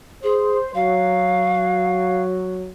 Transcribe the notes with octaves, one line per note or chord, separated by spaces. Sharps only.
G#4 C5
F#3 F5